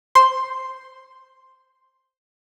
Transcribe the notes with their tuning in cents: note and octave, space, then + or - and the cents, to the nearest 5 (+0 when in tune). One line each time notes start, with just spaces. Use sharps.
C5 +0 C6 +0